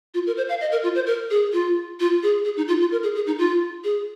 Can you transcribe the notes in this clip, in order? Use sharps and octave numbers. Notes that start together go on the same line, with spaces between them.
F4
A#4
C5
F5
D#5
A#4
F4
C5
A#4
G#4
F4
F4
G#4
G#4
D#4
F4
F4
A#4
G#4
G#4
D#4
F4
G#4